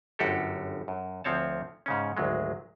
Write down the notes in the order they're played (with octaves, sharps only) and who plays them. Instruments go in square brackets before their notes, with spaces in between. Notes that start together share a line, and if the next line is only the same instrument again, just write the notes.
[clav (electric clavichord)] G1 F#2 F#4 G4 A4
F#2
D2 F3 C4 C#5 A5
G#2 C#3 C#4
G#1 D2 F#3 G#3